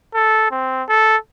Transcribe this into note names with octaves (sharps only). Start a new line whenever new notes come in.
A4
C4
A4